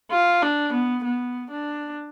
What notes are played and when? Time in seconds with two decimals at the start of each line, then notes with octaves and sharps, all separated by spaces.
0.11 F4
0.43 D4
0.73 B3
1.04 B3
1.51 D4